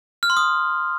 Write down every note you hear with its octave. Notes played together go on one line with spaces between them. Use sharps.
F6
C6
D#6